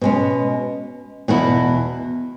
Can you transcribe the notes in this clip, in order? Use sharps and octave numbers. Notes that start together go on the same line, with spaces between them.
B2 G#3 C#4
E2 B2 B3 E4